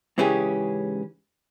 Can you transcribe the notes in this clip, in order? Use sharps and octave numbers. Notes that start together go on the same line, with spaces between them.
G#2 C#3 E3 C#4 G4 G#4